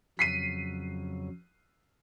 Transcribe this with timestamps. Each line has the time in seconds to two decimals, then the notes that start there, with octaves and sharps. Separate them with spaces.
0.19 F2 C#3 F#3 B6 C7 D#7